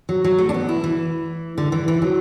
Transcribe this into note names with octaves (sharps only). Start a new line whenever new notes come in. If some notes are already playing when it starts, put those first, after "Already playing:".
F#3
F#3
A3
D4
B3
E4
E3
D3
E3
E3
F#3